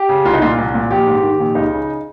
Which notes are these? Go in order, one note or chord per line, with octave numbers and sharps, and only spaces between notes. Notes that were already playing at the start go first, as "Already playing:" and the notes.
Already playing: G4
C#3
C2 F4
D#4
A#2 F4
C2
A#2
A#1 G4
G#2
D#3
A#1
C#2 D#4
C#3